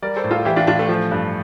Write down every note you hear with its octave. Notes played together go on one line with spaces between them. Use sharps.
G3 A#4 D5
A4 C5
A2
F4 A4
E3 E4 G4
D4 F4
A2 D4 F4
A3
F3
G2